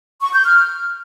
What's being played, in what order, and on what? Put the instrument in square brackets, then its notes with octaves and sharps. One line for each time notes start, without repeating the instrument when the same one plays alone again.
[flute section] C#6
G6
F6